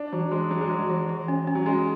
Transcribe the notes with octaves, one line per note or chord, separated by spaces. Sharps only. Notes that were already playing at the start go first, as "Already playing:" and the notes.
Already playing: D4
E3 F#3
E3 G#3
E3 F#3
G#3
E3 F#3
E3
E3
C#4
C#4
F#3
G#3 C#4